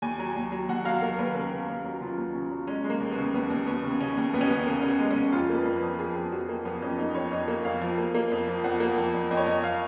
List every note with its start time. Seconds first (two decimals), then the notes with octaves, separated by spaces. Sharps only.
0.02 D#2 G#5
0.19 F#3
0.36 D#2
0.52 F#3
0.69 D#2 F#5
0.85 F#3 F5
1.02 D#2 A#4
1.19 D#2 B4
1.35 C#3 A#4
1.51 C#3
1.68 D#2
1.85 F#3
2.01 C#3 F4
2.17 D#2
2.35 C#3
2.51 F#3
2.67 G#3 C#4
2.84 G#3
2.90 A#3
3.00 D#2
3.11 B3
3.17 C#3
3.34 D#2 B3
3.50 D#2
3.66 D#2 B3
3.83 C#3
4.00 C#3 C#4
4.17 D#2
4.34 D#2 B3
4.41 C#4
4.49 C#3 B3
4.66 C#3 A#3
4.81 C#3 C#4
4.88 B3
5.00 G#3
5.11 C#4
5.16 C#3
5.32 F2 F4
5.50 A#3
5.55 B4
5.65 F2
5.77 B4
5.83 F2
5.98 F3 G#4
6.16 F2
6.32 F2 F#4
6.49 A#3
6.65 F2 B3
6.82 F2 C#4
6.98 A#3 D#4
7.15 F2 C#5
7.32 F2 D#5
7.48 A#3
7.65 F2 F5
7.81 F3
7.98 A#3
8.15 A#3
8.31 F2
8.48 F3
8.64 F2 F#5
8.80 A#3
8.98 F2
9.14 F2
9.31 F2 D#5
9.37 C#5
9.45 F2 D#5
9.64 F5